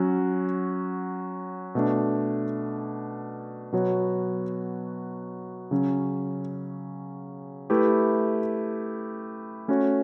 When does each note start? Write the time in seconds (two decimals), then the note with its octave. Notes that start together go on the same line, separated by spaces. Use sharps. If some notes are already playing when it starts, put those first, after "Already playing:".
Already playing: F#3 C#4 F#4
1.75 B2 A3 D4
3.72 B2 F#3 B3 F#4 C#5
5.71 C#3 F#3 C#4
7.70 A3 E4 G4 B4
9.68 A3 C#4 F#4 C#5